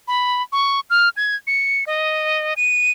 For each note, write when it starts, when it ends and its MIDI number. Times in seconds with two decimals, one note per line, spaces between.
0.08 0.42 83
0.52 0.80 85
0.90 1.09 89
1.17 1.35 92
1.47 1.84 97
1.87 2.54 75
2.57 2.91 99